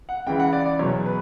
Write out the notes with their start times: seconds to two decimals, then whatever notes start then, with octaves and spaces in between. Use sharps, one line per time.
0.09 F#5
0.26 C#2 C#3 E3 G5
0.39 F#5
0.53 D5
0.66 D5
0.79 E2 B2 F#3 C#5
1.06 B4